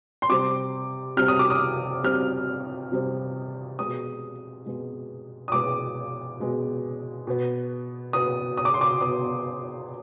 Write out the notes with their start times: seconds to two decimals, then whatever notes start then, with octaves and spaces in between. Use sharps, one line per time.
0.22 C6
0.29 C3 G3 C4 D6
1.17 C3 G3 C4 F6
1.28 D#6
1.39 D6
1.50 D#6
2.04 C3 G3 C4 F6
2.92 C3 G3 C4
3.79 B2 G#3 B3 D#6
4.65 B2 G#3 B3
5.48 D#6
5.52 B2 G#3 B3 D6
6.40 B2 G#3 B3
7.27 B2 B3
8.13 B2 B3 D#6
8.57 D#6
8.65 D6
8.74 C6
8.81 D6
9.01 B2 B3 D#6